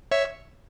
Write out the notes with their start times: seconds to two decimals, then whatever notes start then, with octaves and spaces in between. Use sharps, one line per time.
0.11 C#5 E5